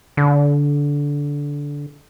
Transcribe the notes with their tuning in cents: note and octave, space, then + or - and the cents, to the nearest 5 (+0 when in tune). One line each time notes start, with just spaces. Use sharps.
D3 -20